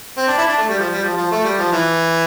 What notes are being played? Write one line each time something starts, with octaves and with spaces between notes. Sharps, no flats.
C4
D4
E4
D4
A3
G3
F3
G3
F3
F3
A3
G3
F3
E3